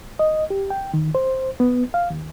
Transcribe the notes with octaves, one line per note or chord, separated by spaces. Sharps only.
D#5
G4
G5
D#3
C5
B3
F5
D#2